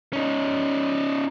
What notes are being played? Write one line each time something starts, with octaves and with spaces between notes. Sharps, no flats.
C#4 D#4